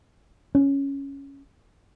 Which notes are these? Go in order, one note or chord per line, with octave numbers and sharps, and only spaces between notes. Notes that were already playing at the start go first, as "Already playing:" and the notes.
C#4